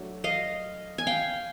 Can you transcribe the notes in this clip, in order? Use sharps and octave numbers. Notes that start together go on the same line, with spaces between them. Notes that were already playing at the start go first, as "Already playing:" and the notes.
Already playing: F#3 A3 D4
D#5 F5
G#5
F5 G5